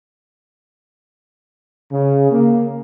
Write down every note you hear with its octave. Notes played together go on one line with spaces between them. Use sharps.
C#3
A#3